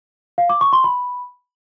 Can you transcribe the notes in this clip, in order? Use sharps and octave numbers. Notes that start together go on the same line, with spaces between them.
F5
D6
C#6
C6
B5